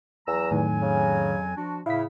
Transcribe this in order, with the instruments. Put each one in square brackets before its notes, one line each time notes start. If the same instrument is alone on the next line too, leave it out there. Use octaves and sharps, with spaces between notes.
[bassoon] E2 [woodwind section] F#3 A#5 E6
[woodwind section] F2 F#3 G#5 [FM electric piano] A2 D#3
[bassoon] C#3
[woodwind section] F3 D4 F#4
[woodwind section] A2 C#3 [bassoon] E4 [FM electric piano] F5 B6